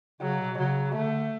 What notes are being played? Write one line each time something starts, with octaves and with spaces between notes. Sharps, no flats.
C#3 F#3
B2
C#3 F#3
D3 A3